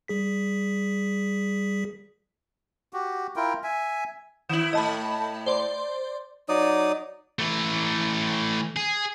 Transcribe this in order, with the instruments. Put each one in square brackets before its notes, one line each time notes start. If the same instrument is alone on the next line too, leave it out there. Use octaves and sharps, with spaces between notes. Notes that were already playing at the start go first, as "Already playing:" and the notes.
[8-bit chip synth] G3 G#4 B6
[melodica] F#4 G4
E4 F4 A#4 G5
E5 G#5
[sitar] D#3 E4 [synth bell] E7 F#7
[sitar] A2 A3 [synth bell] D#5 A5 B5
[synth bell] C5 D5 C6
[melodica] F#3 D#4 D5 D#6
[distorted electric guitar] E3 A3
G#4